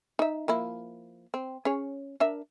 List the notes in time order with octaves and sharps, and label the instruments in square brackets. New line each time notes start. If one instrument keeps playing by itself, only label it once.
[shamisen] D#4 E5
F3 A#3 E4
C4
C#4 G#4 C#5
D4 A#4 E5